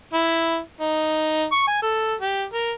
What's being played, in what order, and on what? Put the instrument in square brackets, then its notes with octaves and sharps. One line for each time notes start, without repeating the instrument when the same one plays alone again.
[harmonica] E4
D#4
C#6
G#5
A4
G4
A#4